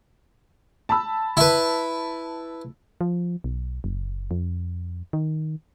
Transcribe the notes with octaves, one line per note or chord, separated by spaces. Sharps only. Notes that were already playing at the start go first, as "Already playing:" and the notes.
A5 B5 E6
E4 B4
F3
B1
F#1
F2
D#3